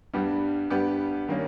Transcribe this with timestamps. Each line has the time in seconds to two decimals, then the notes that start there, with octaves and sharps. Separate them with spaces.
0.14 G2 G3 B3 G4
0.70 G2 G3 B3 G4
1.28 D#3 G3 A#3 C#4